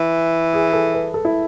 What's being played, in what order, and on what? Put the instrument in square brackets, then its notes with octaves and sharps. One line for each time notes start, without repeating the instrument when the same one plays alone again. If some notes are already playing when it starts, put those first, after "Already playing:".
Already playing: [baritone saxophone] E3
[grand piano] G#4
A4
B4
A4
E4